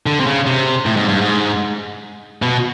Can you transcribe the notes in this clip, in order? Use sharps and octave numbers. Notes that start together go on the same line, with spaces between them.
D3
C3
C#3
C3
A2
G#2
G2
G#2
B2